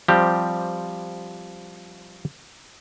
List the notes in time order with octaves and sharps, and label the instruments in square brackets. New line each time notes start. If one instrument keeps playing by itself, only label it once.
[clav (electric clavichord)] F3 G3 C4 G4